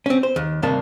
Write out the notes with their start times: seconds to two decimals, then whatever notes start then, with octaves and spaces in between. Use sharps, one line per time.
0.06 C4 C#4
0.23 C5
0.36 D#2
0.62 D2 G2 C3 D#3 A#3 A5